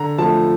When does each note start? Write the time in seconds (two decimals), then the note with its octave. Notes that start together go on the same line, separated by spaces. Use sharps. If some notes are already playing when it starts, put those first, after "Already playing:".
Already playing: D3 A#5
0.18 F3 A3 A5